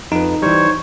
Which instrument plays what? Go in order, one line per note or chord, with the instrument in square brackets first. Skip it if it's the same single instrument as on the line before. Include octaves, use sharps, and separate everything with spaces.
[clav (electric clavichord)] F2 B4 [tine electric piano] D#4
[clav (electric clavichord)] E3 G3 [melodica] C5 C#5 C#6